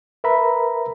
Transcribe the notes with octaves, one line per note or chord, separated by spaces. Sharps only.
A#4 B4 E5 A#5 B5